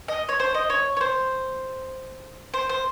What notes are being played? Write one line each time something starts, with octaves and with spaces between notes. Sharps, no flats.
D#5
C#5
C5
D#5
C#5
C#5
C5
C5
C5